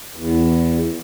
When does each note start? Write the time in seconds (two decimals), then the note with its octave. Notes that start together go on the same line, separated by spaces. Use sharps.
0.16 E2